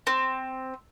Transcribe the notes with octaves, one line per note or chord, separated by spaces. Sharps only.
C4